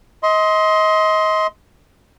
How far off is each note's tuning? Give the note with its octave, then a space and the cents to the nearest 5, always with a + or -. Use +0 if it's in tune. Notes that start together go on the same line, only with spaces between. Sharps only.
D#5 +30 C6 +0